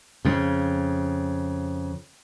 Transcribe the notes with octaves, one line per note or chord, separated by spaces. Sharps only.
F2 C#3